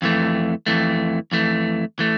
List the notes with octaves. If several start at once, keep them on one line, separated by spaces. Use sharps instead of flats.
F2 E3 A3
F2 E3 A3
F2 E3 A3
E3 A3